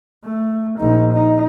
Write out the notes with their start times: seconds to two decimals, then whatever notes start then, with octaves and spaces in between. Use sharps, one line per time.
0.25 A3
0.79 A#1 D#4
1.13 D#4